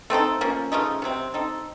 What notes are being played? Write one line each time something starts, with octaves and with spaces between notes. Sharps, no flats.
A3 C4 D#4 A4
F3 A#3 C#4
C#3 F3 A3 D#4
C3 F#3 C4
C4 D#4 A4